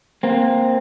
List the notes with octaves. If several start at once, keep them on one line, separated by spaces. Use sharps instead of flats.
A#3 C4